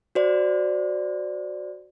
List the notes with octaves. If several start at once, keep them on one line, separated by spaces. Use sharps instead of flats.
F#4 C5 D5